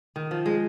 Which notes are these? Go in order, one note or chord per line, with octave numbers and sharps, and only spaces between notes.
D#3
F3
G#3